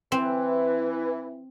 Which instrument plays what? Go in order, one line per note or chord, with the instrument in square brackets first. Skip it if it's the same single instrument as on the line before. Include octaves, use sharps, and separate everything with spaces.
[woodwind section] E3 [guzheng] C4